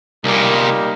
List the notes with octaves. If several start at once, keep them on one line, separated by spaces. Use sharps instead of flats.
C2 A#2 G3 A#3 D#4